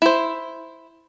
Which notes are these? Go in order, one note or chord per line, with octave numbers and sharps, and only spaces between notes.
E4 C5